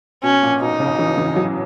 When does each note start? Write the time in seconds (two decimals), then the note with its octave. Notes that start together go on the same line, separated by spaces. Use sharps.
0.23 B2 C#4
0.43 A#2
0.61 B2 D#4
0.80 C#3
0.99 E3
1.17 E3
1.36 F#3